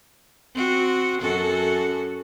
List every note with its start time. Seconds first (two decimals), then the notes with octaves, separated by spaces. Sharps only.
0.55 C4 F#4
1.21 F#2 F#4 A4